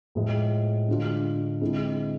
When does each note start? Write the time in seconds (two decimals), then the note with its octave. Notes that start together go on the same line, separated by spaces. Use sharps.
0.15 A2 F3 G#3
0.88 D3 G#3 D4 F4
1.61 D3 G#3 C4 E4